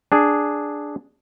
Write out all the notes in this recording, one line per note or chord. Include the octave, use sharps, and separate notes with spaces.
D4 G#4